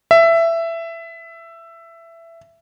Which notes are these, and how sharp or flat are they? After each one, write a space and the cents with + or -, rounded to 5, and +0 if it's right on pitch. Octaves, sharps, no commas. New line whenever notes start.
E5 +15